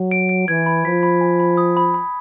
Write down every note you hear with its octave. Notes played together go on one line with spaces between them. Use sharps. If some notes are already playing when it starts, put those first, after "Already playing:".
Already playing: F#3
D7
D7
E3 G#6
B5
F3 B6
B5
G#5
B5
D#6
B5
B5